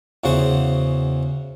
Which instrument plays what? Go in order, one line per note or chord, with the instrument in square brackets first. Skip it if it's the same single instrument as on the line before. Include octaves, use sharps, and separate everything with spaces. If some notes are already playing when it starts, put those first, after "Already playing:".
[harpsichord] E2 C#3 F#4 C5